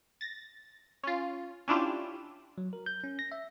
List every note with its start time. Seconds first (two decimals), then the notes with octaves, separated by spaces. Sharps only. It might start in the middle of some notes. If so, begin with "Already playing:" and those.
0.21 A6 A#6
1.03 C#4 F4
1.68 C#4 D4 E4 F4 G4
2.58 F#3
2.73 A#4
2.86 G6
3.04 C#4
3.19 A#6
3.32 E5